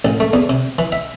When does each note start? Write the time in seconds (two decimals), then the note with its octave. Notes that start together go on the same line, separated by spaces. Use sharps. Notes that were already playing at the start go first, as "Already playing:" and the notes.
0.05 A1
0.20 A3
0.33 E2
0.49 C3
0.79 E3
0.92 E5